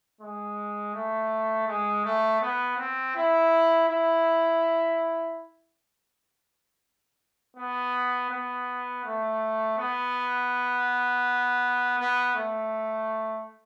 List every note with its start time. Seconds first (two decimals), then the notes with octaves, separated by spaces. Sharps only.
0.21 G#3
0.95 A3
1.68 G#3
2.05 A3
2.42 B3
2.78 C4
3.16 E4
3.89 E4
7.57 B3
8.30 B3
9.05 A3
9.78 B3
11.99 B3
12.36 A3